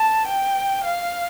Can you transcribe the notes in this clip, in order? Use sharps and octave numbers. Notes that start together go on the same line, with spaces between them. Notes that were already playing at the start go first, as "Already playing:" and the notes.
Already playing: A5
G5
F5